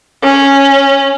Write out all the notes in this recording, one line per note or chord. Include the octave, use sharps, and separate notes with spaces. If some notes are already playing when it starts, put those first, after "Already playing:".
C#4